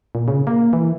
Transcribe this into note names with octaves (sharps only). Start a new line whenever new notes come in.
A#2
C#3
A#3
E3